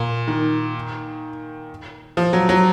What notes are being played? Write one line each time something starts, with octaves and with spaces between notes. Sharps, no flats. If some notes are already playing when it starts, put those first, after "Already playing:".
Already playing: A#2
D#3
F3
F#3
F#3